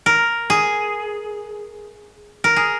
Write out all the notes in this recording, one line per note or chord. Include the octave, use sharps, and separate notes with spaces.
A#4
G#4
A#4
G#4